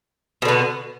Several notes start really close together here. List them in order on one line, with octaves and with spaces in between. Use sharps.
B2 D3 B3